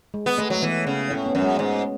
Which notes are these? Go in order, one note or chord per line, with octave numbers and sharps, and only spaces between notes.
G#3
B3
G#3 A3
F#3 A3
E3 B3
C#3
A2 C#4
B3
F#2
G#3
G#2